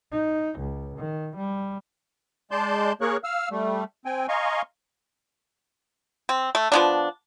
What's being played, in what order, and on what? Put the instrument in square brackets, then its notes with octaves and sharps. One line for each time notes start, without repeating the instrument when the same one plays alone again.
[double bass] D#4
C#2
D#3
G3
[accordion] G#3 D5 A5 C6 G6
A#3 G#4 A#4 C#5 C#6 F#6
F5 E6 F6
G3 A3
C4 G5 G#5
D#5 F5 G#5 A#5 C6 C#6
[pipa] C4
A3
F3 B3 D4